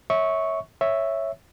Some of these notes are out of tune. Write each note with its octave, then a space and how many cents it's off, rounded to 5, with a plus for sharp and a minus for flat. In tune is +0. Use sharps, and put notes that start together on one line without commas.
C#5 +0 E5 -25 C#6 +0
C#5 -5 E5 +0